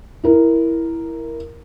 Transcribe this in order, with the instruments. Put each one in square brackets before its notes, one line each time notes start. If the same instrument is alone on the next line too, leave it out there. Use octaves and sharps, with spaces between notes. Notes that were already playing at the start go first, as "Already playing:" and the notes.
[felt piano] E4 A#4